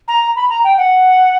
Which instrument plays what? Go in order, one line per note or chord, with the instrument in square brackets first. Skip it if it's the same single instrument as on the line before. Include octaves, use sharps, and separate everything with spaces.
[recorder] A#5
B5
A#5
G5
F#5